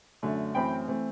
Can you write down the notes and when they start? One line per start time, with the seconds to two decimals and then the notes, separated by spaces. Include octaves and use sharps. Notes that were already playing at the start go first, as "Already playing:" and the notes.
0.23 F#2 D3 A3
0.55 F#2 E3 A3 C4 G5 B5
0.88 E3 A3 C4